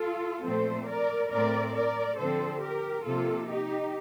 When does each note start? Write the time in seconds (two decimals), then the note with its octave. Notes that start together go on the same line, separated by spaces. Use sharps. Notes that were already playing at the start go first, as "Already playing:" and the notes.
Already playing: F4 A4
0.44 A#2 F3 A3 C4 A4 C5
0.87 A#4 D5
1.31 A2 A3 C4 A#4 D5
1.74 A#4 D5
2.18 D3 F3 C4 A4 C5
2.62 G4 A#4
3.05 C3 F3 A#3 F4 A4
3.49 D#4 G4